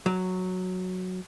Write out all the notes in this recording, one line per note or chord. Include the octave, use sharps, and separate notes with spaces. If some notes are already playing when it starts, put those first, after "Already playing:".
F#3